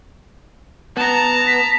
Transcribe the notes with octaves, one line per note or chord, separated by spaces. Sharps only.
B3 A5 A#5
B6